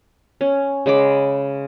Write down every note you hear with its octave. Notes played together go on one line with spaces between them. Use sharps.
C#4
C#3 G#3 B5 D6